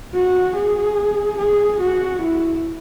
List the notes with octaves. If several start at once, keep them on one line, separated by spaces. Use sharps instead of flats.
F#4
G#4
G#4
F#4
E4